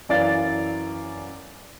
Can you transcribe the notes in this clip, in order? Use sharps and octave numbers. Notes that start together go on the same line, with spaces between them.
F#2 E3 D5 F5 A6